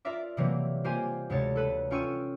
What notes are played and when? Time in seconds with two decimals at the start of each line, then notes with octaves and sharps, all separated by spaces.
0.05 F4 A#4 D5 E5 D6
0.37 C3 E3 F#3 G3 A#3 C4
0.84 A#3 F4 G4 C5 G5 G#5
1.30 D2 C3 G#3 C#5 A6
1.56 A4 B4
1.91 C#4 F4 G5 C#6 E6 D#7